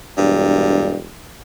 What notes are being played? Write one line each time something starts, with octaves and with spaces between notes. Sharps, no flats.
E1 G2